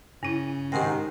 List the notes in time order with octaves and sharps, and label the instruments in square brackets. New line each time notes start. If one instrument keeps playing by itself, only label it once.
[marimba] G2 E4 [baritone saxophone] C#3
[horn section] G#2 C3 D#3 [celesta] G4 F#5 G5 [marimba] D#5 A#6